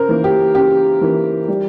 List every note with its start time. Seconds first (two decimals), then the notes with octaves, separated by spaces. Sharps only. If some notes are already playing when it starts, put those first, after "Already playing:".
Already playing: C#3 A#4 C5
0.09 E3 A#3
0.24 G4
0.55 C#3 G4
1.01 E3 A#3
1.48 G3